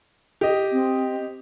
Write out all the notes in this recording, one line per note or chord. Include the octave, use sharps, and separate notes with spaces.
G4 D#5
C4